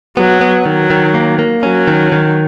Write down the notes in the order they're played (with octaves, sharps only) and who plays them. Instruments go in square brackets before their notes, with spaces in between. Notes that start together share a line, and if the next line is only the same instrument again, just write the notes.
[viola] F#3 [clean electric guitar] B3
[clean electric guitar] B3
[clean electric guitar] D#3 [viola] F#3
[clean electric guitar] D#3
A#3
A#3
[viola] F#3 [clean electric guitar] C#4
[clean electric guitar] D#3
D#3